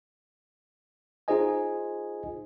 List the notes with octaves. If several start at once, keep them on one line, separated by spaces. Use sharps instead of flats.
D#4 F4 G#4 C5 D#5 G#5